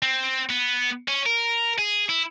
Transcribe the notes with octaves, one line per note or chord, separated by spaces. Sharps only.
C4
B3
C#4
A#4
G#4
E4